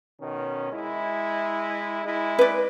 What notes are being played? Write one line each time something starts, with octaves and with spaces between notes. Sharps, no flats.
B2 D#3 C#4
G#3 E4
G#3 E4
B4 D5